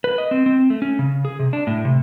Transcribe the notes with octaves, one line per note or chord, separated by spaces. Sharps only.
B4
D#5
C4
C4
A3
C#4
C#3
G#4
C3
D4
A2
C3